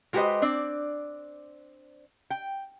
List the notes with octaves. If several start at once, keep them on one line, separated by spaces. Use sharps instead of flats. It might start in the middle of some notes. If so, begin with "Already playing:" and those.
G#3 F#4 G4 B4 C5 D#5
C4 D4 D5
G5